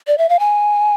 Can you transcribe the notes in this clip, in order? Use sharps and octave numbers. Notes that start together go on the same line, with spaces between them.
D5
E5
F5
G#5